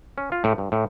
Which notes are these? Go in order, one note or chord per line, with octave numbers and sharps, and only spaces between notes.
C#4
F4
A2
G2
A2